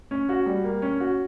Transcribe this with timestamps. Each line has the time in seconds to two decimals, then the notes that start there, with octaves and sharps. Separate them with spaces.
0.11 C#4
0.29 F#4
0.46 G3
0.64 A#3
0.82 C#4
1.00 F#4